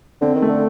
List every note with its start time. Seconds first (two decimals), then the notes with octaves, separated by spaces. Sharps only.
0.21 D3 C4
0.35 D#3
0.42 A3
0.49 D3